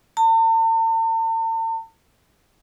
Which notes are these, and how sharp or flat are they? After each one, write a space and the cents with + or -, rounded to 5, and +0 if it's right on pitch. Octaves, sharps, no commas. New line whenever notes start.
A5 +45